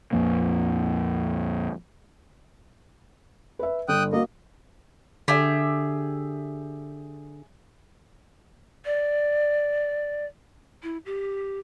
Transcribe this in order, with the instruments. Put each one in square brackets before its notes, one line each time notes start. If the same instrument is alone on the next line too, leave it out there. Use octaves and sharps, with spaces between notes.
[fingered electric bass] A#1 F2 F3 A#3
[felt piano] B4 E5
[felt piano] G1 [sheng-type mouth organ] G5 D#6 F#6
[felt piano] A#3 F#4 [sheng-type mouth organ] D#5
[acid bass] D3 [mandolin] G4 G#4 E5
[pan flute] D5
E4
G4